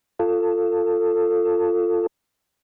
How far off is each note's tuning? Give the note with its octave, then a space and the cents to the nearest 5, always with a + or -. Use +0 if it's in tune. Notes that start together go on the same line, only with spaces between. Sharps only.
F4 +0 A4 +15